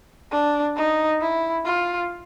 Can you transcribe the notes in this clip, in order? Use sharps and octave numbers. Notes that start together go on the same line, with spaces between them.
D4
D#4
E4
F4